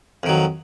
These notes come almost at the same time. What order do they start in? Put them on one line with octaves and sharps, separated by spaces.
F2 D#3 F#3